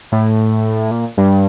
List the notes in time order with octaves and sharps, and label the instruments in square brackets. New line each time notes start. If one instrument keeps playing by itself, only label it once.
[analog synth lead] A2
A#2
G2